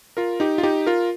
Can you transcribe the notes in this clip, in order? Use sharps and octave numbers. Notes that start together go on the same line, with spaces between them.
F4 A#4
D#4 G4
F4
D#4 G4
F4 A#4